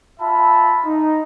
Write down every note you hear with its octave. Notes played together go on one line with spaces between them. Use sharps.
F4 E5 A5 B5
D#4